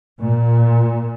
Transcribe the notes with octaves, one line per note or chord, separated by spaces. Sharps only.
A#2